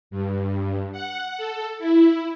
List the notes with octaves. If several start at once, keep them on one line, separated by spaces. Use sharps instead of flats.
G2
F#5
A4
E4